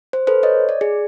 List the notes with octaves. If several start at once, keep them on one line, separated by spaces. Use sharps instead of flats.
C5
A4 B4 C5
C#5 D#5
D5
G#4